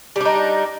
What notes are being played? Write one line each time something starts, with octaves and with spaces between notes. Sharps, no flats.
G3 D4 D#4